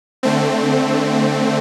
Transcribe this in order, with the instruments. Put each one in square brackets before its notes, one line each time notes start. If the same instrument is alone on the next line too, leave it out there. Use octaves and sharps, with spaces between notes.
[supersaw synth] D3 A3 C4